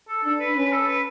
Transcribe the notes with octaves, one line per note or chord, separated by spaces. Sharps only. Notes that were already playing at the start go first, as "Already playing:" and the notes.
A4
D4 A4
B4
C#4 B4
B4
A4
B4